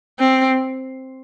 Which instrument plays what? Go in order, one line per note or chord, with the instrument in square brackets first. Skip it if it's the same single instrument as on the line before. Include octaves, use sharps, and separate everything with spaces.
[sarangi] C4